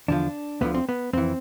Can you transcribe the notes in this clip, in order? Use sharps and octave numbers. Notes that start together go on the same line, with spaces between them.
E2 D3 F3 D4
D2 D3 F3 B3
C4
B3
F2 E3 C4